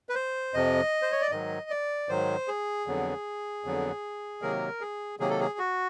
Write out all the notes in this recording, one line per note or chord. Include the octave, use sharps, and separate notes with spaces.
B4
C5
F2 C3 F3 D#5
C5
C#5
D5
G#2 D#3 F#3 D#5
D5
G#2 D#3 F#3 C5
G#4
F2 D3 F#3 B3
F2 D3 F#3 B3
C3 D#3 F#3 A#3 A#4
G#4
C3 D#3 F#3 A#3 G#4
A4
G#4
F#4